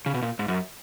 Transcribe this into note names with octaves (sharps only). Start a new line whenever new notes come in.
C#3
B2
A#2
G#2
F#2